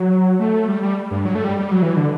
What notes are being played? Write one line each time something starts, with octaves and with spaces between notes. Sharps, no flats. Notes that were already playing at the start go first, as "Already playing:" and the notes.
Already playing: F#3
A3
G3
G3
G2
F#3
A3
G3
G3
F#3
E3
D3